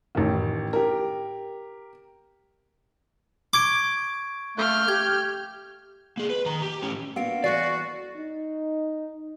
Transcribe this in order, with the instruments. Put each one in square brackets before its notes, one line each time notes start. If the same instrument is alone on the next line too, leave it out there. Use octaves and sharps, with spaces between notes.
[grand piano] A1 D#3
G4 A#4
[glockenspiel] C#6 G#6 D7 [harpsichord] D6
[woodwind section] A3 A#3 [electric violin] F6 G6
[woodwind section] G4 [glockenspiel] G#6
[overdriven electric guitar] A#3 G#4
B4
D#3 A#5
G4
A2 C#4
[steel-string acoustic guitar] A#3 D4 F#4 [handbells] B3 F5 D7
[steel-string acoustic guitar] E3 A3 [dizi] F#4 [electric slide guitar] D5 [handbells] C7
[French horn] D#4